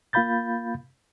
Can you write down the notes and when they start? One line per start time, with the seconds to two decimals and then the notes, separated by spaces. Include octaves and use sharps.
0.13 A#3 F4 F5 B5 G6 A6